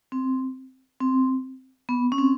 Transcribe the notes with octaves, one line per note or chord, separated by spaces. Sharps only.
C4
C4
B3
C#4
C4